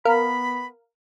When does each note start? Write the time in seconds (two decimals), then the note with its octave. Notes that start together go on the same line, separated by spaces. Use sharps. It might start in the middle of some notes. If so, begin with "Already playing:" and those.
0.05 B3 A#4 F5 B5